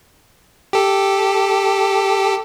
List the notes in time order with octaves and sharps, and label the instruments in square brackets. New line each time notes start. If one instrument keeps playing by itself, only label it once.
[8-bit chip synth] G4 A4